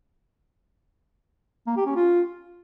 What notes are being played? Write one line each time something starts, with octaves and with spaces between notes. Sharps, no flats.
A#3
G4
C#4
F4